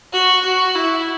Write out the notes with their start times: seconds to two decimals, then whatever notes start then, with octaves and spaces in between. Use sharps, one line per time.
0.13 F#4
0.44 F#4
0.75 E4